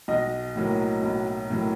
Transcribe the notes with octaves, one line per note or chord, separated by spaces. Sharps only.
B1 D#5
A2 F#3 A#3
B1
A2 F#3 A#3